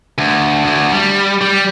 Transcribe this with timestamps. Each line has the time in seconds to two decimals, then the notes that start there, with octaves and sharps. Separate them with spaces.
0.18 D2
0.64 D2
0.92 G3
1.41 G3